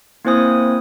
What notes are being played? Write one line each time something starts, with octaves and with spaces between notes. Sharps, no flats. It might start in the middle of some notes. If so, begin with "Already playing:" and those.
A#3 C4 E4 C5 G#5 D#6